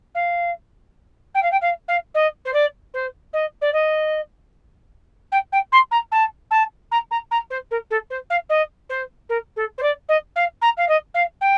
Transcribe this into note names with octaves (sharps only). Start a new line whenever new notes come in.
F5
G5
F5
G5
F5
F5
D#5
C5
D5
C5
D#5
D5
D#5
G5
G5
C6
A#5
A5
A5
A#5
A#5
A#5
C5
A#4
A4
C5
F5
D#5
C5
A#4
A4
C5
D5
D#5
F5
A#5
F5
D#5
F5
G5